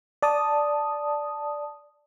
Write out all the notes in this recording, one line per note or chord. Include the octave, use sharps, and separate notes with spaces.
D5 A5 D#6